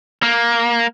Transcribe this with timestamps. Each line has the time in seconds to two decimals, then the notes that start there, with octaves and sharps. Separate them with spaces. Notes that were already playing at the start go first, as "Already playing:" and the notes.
0.23 A#3